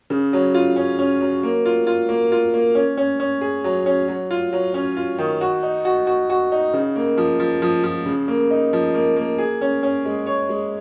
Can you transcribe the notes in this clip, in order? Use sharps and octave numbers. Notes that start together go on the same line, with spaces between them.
C#3
F#3
F4
C#4
C#4
F#3
A#3
F4
F4
A#3
F4
A#3
C#4
C#4
C#4
G#4
F#3
C#4
F#3
F4
F#3
C#4
F4
D#3
F#4
D#4
F#4
F#4
F#4
D#4
C#3
A#3
F3
F3
F3
F3
C#3
A#3
D#4
F3
A#3
A#3
G#4
C#4
C#4
G#3
C#5
G#3